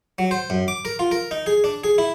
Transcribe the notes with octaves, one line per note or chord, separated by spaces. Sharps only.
F#3
C5
F#2
D6
A#4
F4
A#4
D#4
G#4
D4
G#4
E4